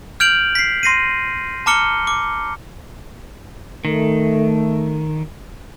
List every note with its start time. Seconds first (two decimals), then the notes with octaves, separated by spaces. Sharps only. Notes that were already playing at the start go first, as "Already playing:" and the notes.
0.20 F6 G6 G#6 D7 F7 F#7
0.55 B6 C7
0.83 C6 A#6 C7 D#7
1.66 A5 A#5 D6 F6 C#7 G7
2.07 D6
3.85 D#3 A3